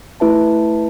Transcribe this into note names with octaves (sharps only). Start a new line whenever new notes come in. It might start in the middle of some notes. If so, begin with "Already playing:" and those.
A3 E4 B4 E5 A5